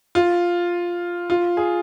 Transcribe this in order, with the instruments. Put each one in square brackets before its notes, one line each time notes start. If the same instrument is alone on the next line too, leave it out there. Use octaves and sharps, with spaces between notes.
[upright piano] F4
F4
G#4